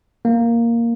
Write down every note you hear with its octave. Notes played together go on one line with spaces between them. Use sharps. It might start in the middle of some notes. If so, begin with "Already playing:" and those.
A#3